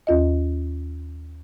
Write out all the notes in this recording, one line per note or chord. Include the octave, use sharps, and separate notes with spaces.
D#2 F4 D#5